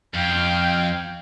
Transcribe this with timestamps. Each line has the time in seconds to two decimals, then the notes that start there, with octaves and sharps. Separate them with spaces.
0.14 F2 F5 G5